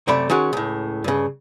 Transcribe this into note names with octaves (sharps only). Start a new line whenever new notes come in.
F#2 C3 A3 D5 B5
D#3 G#3 C#4 F#4
C#2 A2
G2 C#3